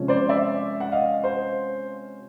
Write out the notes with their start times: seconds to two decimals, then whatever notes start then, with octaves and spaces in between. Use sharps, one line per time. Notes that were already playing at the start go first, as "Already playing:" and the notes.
Already playing: C3 F3 G#3 C#4
0.08 C5 D5
0.29 D5 E5
0.80 F#5
0.92 D#5 F5
1.24 C5